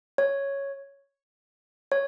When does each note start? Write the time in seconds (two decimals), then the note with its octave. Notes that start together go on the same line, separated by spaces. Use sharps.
0.18 C#5
1.92 C#5